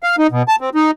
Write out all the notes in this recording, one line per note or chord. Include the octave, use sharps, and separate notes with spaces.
F5
D#4
B2
A5
C4
D#4